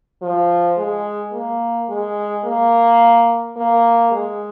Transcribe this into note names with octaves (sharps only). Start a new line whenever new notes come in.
F3
G#3
A#3
G#3
A#3
A#3
G#3